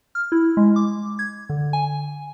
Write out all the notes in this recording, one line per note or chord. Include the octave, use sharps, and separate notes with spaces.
F6
E4
G#3
D6
G#6
D3
G#5